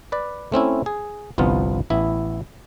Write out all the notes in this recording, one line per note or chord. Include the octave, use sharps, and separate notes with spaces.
B4 D5
A3 C4 C#4 E4
G#4
G1 C2 F3 B3 F4
A1 B3 E4 E5